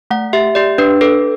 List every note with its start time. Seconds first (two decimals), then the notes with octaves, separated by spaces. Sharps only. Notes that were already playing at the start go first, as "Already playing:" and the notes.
0.11 A3 F#5
0.33 G4 E5
0.55 G4 D5
0.78 D4 B4
1.01 A4 B4